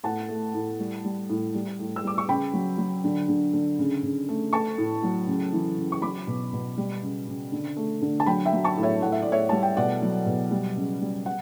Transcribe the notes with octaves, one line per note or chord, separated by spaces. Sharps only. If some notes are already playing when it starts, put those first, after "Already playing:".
A2 F#5 A5
A3
A2
G3
G3
A2
G3
A2
E6
G3 D6
C#6
C#3 G5 B5
F#3
F#3
D3
D3
D3
C#3
C#3
A3
A3 A5 C#6
A2
F#3
C#3
E3
C#3
C#6
F#3 B5 D6
B2
B2
G3
C#3
C#3
D3
A3
D3
A5
F#3 G5 B5
E5 G5
F#3
A5 C#6
A2
C#5 E5
A2 F#5
E5
A2 D5
C#5 E5
G3 A5
G5
B2 D5 F#5
F#3
B2
G3
C#3
G3
F#5